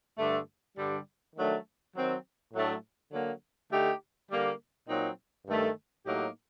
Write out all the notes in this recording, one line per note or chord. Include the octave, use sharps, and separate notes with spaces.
G2 D3 A3
G2 D3 G3
D#3 F#3 A3 D4
D#3 F#3 C4
A2 F#3 A3 D4
D3 F#3 A#3
D3 A3 D#4 G4
D3 G3 A#3
A#2 F#3 C4 D#4
G2 D#3 A3
A2 F#3 A#3 D#4 G4